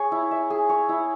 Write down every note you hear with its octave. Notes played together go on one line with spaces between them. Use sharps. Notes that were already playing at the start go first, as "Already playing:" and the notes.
Already playing: G#4 C#5
E4
E5
G#4
C#5
E4